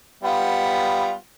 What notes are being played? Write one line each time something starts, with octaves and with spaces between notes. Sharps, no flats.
G3 B3 F4